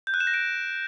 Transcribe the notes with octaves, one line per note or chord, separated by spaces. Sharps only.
G6
F#6
E7
A#6
D7